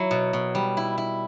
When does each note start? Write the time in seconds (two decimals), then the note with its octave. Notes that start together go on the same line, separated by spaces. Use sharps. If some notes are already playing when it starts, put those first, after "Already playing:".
Already playing: F#3 E4
0.11 B2
0.33 B2
0.55 G3
0.77 E4
0.98 E4